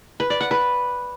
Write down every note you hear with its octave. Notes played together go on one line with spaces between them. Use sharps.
B4
D5
F#5
B4